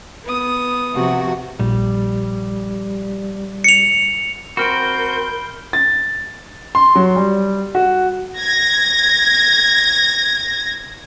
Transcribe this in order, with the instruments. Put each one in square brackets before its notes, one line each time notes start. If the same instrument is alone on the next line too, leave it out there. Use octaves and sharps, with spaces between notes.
[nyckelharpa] B3 D#6
[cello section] C3 F3 F#4
[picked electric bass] A#1 [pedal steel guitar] G3
[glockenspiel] C#7 F7
[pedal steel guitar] C4 F#4 [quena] A#4 [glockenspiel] B5 F6 D7 [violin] G6
[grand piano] A6
C6
F#3
G3
F#4
[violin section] G#6 A#6